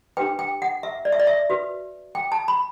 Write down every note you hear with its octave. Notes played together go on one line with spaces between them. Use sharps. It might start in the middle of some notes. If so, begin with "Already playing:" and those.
D4 G4 B4 G5
G5
F#5
E5
D5
E5
D5
E5
F#4 B4
G5
A5
B5